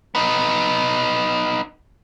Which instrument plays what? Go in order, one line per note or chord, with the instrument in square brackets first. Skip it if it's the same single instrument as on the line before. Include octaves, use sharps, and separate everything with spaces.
[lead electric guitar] B3 D#4